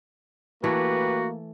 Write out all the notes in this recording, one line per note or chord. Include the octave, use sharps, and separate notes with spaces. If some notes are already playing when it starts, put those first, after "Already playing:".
E3 A3 A#3 F#4 G4 B4